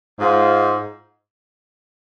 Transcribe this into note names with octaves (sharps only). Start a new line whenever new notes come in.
G#2 G#3 F4 C5